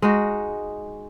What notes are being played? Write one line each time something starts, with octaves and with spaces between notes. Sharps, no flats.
G#3 D#4 F#4